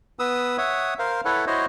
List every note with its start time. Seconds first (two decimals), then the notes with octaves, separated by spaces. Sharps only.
0.19 B3 B4 D#6 E6
0.58 C#5 E5 F#5 D#6
0.99 A#4 C5 F5
1.25 E4 A4 B4 C#5 F#5
1.47 E4 F#4 C5 C#5 D#5